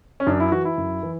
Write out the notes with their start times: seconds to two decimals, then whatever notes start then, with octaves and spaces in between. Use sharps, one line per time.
0.20 C#4
0.27 F#2 D4
0.40 E4
0.52 E3 F#4
0.65 E4
0.78 F#2
1.03 E3